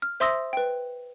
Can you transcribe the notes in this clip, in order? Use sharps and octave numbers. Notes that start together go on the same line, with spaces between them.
F6
C5 E5 C6 D#6 E6 A#6
B4 G5